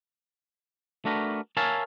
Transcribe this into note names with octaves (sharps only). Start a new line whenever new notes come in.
A3 D4 F#4 A#4 B4
A#4 C#5 E5 F5 G#5 A5